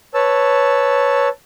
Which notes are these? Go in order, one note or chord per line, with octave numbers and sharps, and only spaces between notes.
B4 C#5 A5 E6